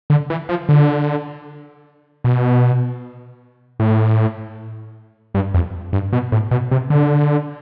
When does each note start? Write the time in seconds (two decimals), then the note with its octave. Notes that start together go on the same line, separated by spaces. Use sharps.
0.10 D3
0.30 E3
0.49 F3
0.69 D3
2.24 B2
3.80 A2
5.35 G2
5.54 F2
5.93 G2
6.13 B2
6.32 A2
6.51 B2
6.71 C3
6.90 D3